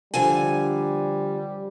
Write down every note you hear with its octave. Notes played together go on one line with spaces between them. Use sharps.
D3 F3 G3 G#5